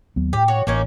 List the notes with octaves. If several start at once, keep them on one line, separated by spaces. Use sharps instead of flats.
D#2 F#3 B3
A2 G4
F#4 C#5
A1 A#3 C#4 D#4